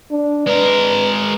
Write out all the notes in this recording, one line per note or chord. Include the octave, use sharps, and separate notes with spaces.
D4
G#3 A#4 B4